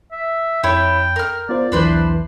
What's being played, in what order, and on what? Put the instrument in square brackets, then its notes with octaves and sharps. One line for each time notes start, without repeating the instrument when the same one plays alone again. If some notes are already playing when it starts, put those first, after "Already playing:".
[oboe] E5
[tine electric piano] F2 [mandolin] E4 C#5 [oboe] G5
[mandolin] A#4 F6
[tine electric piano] B3 F4 C5 [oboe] D5
[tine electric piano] B1 E2 E3 [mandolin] D4 B4 C5